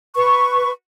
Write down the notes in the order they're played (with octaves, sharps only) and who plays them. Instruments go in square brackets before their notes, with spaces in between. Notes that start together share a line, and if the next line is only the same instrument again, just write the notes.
[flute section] B4 C#6